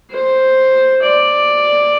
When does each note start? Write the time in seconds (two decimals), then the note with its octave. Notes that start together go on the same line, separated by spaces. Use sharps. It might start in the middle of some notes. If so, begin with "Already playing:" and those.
0.11 C5
1.01 D5